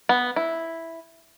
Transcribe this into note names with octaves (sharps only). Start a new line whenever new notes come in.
B3
E4